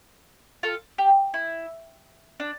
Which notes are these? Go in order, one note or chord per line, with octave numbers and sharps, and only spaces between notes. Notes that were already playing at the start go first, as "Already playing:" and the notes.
F4 A4
G4
E4
D4